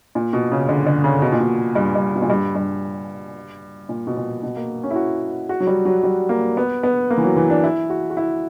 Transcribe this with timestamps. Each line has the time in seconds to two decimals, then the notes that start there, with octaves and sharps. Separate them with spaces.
0.15 A#2
0.33 B2
0.52 C#3
0.69 D3
0.86 D3
1.04 C#3
1.22 B2
1.32 A#2
1.40 B2
1.75 G2
1.95 G2
2.15 B2
2.22 A#2
2.30 G2
2.55 G2
3.89 A#2
4.07 B2
4.17 A#2
4.43 B2
4.56 A#3
4.83 C#4
4.91 E4
4.96 F#4
5.49 F#4
5.60 F#3
5.67 G3
5.85 F#3
6.04 G3
6.29 A#3
6.57 B3
6.83 B3
7.10 A#3
7.18 E3
7.23 F#3
7.36 E3
7.50 D4
7.64 E4
7.90 F#4
8.10 F#4
8.17 E4